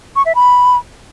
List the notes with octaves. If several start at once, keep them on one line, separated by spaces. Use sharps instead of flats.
C#6
E5
B5